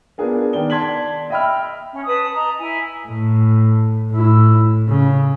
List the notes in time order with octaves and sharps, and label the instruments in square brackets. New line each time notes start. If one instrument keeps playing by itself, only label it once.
[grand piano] B3 D4 F4 G#4 A#4
D#3 B3 D5 G7
D5 A5 C6 G#6 B6 F#7
D#5 E5 G5 B5 E6 F6
[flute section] C#4
B4 A5 D#6
D#5 A#5
E4 G#5
[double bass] A2
A2 E4
C#3